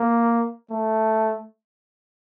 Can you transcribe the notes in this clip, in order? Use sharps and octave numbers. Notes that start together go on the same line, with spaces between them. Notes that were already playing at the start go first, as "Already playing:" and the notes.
Already playing: A#3
A3